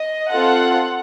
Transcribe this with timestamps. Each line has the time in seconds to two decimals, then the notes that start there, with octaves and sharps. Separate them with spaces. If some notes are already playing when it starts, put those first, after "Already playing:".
Already playing: D#5
0.31 C4 F4 A4 F#5